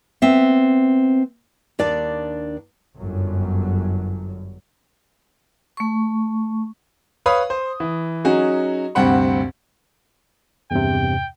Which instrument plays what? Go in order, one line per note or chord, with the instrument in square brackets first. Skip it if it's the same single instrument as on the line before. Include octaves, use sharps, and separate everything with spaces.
[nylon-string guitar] B3 C4 E5
D#2 D4 D5
[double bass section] G1 F#2 F#3
[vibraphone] A3 C#6
[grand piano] B4 C#5 F5 B5 D#6
C5
E3
F#3 C#4 D#4 F#4 G#4
D2 G2 C3 C4 F#5 B5
[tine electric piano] E2 G2 C3 [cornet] G5